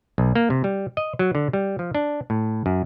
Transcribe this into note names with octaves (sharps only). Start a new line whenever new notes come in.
B1
A#3
C3
G3
D#5
F#3
D3
G3
F3
D4
A2
F#2